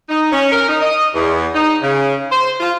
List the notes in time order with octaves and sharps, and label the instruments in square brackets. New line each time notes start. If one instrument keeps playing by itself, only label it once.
[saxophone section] D#4
C#4
A#4
D#4
D#5
E2
D#4
C#3
C5
F4